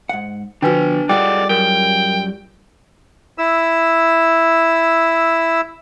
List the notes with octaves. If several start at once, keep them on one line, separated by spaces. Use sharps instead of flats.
G#2 F#5
D3 F3 D4 F#4 B4 G5 G#5
G3 F4 G#4 A4 D5 D#5 F#5 G5
F#2 A#4 G5
E4 E6